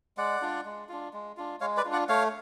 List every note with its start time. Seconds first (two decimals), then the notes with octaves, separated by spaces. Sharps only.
0.17 G#3 D5 F#5
0.42 D4 F4
0.65 G#3
0.89 D4 F4
1.13 G#3
1.37 D4 F4
1.61 G#3 C#5 F5
1.77 B4 D5
1.85 D4 F4
1.93 D5 F#5
2.09 A3 C#5 F5